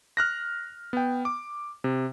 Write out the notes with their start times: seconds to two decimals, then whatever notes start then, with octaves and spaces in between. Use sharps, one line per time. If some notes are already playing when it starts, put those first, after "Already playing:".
0.17 F6 F#6 A#6
0.93 B3 G5
1.25 D6
1.84 C3